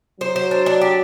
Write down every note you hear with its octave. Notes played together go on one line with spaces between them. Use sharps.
F#3 C5
C5
D4
D4
G4